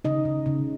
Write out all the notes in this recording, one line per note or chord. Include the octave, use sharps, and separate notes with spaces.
C#3 D#4 D#5
C#3
C#3